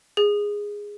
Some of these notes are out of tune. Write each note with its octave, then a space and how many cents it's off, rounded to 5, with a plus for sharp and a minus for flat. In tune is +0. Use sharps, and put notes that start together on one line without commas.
G#4 -10